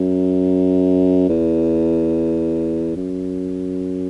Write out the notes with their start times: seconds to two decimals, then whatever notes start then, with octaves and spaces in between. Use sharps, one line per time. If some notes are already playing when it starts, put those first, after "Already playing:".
Already playing: F#2
1.29 E2
2.97 F#2